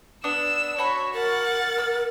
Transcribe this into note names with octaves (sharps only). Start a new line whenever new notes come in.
B3 D4 D#6 E6
F#4 C#5 A5 B5
A#4 F#5 A6
E6